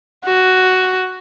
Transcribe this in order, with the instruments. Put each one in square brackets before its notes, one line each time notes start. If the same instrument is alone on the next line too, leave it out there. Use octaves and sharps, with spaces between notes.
[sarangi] F#4